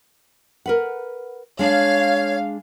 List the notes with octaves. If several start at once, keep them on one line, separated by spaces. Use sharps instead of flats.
A#4 B4 F#5
G#3 D4 C#5 F5